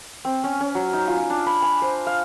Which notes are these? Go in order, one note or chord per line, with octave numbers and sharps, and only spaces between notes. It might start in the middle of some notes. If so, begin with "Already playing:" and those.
C4
C#4
C#4
F#3
D#4
F4
D4
B5
G#5
C5
F5